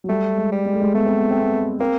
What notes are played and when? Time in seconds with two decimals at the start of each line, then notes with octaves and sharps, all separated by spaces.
0.04 F#3
0.09 G3 A3
0.38 G#3
0.52 G3
0.66 G#3
0.73 A3
0.81 G#3
0.94 A3 B3
1.06 C4
1.18 B3
1.31 C4
1.41 B3
1.80 A#3 C4